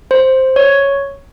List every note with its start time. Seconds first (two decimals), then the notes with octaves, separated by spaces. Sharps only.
0.11 C5
0.56 C#5